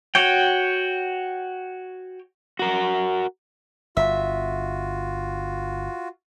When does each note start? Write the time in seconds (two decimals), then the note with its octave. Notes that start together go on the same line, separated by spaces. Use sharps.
0.15 F#4 C#5 G5
2.59 F#4 A#4
3.97 G1 F4 F#4 E5